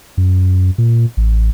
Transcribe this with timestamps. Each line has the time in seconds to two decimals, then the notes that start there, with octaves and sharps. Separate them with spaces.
0.17 F#2
0.78 A#2
1.17 A1